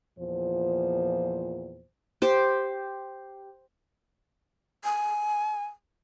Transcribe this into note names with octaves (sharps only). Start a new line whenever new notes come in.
E2 A#2 F3 C5
G4 C5
G#5